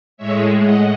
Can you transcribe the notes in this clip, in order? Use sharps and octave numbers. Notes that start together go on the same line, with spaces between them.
A2 G#3 C#5 E5
D#5 F#5